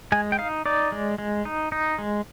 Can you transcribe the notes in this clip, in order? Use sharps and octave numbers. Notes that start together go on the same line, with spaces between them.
G#3 G#5
G5
D#4 F5
D#4 D5
G#3
G#3
D#4
D#4
G#3